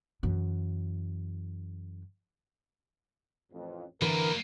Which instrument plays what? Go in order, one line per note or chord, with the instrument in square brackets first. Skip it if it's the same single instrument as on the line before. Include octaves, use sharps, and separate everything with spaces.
[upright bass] F#2 E3
[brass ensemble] A1 F2
[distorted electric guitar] F#2 A#3 [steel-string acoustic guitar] D3 E3 B4 [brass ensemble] A#4